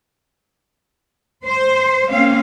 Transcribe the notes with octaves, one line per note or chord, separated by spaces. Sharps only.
C5
A#3 C4 C#4 F5